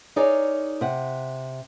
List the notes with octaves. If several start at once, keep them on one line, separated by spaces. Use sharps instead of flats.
D#4 G#4 A#4 C#5 D5
C3 F#5